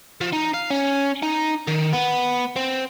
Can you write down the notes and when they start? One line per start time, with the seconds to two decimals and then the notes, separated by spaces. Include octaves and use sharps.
0.21 F3
0.33 D#4
0.54 F5
0.70 C#4
1.23 D#4
1.68 D#3
1.93 B3
2.56 C4